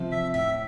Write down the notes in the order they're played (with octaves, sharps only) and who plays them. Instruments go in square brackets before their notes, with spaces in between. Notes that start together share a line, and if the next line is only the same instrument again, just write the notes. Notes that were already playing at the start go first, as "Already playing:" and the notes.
Already playing: [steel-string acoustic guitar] C3 F3
[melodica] E5
[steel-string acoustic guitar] A2 [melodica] E5